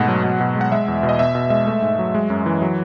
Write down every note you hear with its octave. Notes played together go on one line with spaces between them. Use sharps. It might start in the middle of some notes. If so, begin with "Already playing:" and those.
Already playing: G#2 B2 A3 F#5
F#3
B2
B2
G#3
F#5
G#3 E5
E2
B2
D#5
B2 E5
B2
G#3 E5
A3
G#2
F#3
G#3
F#2
E3
F#3